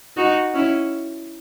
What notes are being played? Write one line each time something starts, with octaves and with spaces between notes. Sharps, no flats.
D#4 F#4
C#4 E4